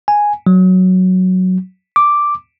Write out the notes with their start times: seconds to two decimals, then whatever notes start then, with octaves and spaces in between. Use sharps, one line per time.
0.08 G#5
0.47 F#3
1.96 D6